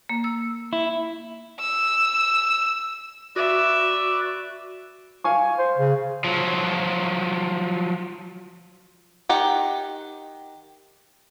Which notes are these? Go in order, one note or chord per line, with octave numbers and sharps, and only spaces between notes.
A#3
E6
E4
E6
F#4 B4 D5 E5
F5 G#5 C#6
C5
C#3
F3 F#3
D#3 D#4 G4 F#5